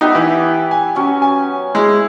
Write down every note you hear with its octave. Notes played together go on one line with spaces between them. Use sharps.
B3 D#4 G4 E5
E3
G#5
F#3 C#4
G#5
G#3 E4